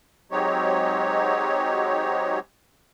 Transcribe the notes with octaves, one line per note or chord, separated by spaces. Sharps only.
F#3 G#3 C4 D#4 G4 C#5